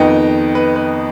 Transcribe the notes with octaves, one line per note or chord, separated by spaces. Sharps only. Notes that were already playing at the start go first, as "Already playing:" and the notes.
Already playing: F2 D#3 B3 D#4 D#5 G5
B4
B4